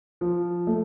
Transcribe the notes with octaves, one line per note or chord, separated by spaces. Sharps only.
F3
A3